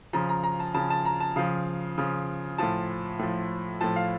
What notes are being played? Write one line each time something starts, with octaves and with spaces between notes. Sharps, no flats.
C#3 F3 A#5
A#5
A#5
A5
C#3 F3 A5
A5
A#5
A5
C#3 F3 F5
C#3 F3
A2 F3 A5
A2 F3
A2 F3 A5
F5